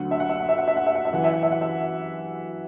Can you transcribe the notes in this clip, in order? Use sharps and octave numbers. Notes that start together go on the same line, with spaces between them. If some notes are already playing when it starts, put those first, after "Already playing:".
Already playing: D2 D3 F#3 F#5
E5
F#5
E5
F#5
E5
F#5
E5
F#5
E5
F#5
E5
F#2 E3 F#5
E5
F#5
E5
F#5
E5